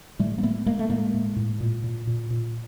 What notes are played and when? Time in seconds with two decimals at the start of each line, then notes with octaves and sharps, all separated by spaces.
0.19 A2 G3 A3
0.38 A#3
0.43 A2 A3 B3
0.66 A2 G#3 A#3
0.79 A3
0.89 A2 G#3 A#3
1.13 A2
1.36 A2
1.60 A#2
1.84 A#2
2.07 A#2
2.30 A#2